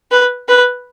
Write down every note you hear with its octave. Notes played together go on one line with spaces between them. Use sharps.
B4
B4